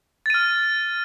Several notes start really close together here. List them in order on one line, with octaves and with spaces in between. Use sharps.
A6 D#7 F6